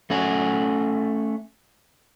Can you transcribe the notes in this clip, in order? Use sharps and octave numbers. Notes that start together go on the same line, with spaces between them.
A3 C#4 F#5 G#5